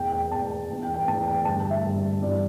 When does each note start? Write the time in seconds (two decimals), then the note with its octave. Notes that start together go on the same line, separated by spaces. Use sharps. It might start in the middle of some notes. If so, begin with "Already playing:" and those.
Already playing: E2 B2 G5
0.12 G5
0.31 E2 B2 A5
0.70 E2 E3
0.83 G5
0.94 G5
1.08 E2 E3 A5
1.26 G5
1.45 G2 D3 A5
1.70 E5
1.84 G2 D3
2.22 G2 E3 D5